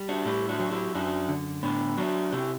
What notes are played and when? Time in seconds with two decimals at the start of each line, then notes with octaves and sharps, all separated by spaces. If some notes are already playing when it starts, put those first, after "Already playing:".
Already playing: G3
0.09 D4 F#4
0.25 A2 E4 G4
0.49 D4 F#4
0.60 F#3
0.71 E4 G4
0.94 F#2 D4 F#4
1.29 D3
1.63 A2 B3 D4
1.97 F#3 D4 F#4
2.32 C3 E4 G4